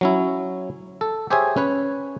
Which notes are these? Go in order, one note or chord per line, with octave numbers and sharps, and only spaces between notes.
F#3 C#4 E4
A4
G4 G#4 C5 C#5 E5 G#5
C#4 B4 C#5